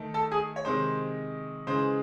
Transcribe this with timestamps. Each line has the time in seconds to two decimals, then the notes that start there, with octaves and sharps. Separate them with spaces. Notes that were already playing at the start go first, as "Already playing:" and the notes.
Already playing: D#3 A3
0.14 A4 A5
0.32 G#4 G#5
0.56 C#5
0.65 C3 D#3 G#3 C5
1.67 C#3 E3 G#3 C5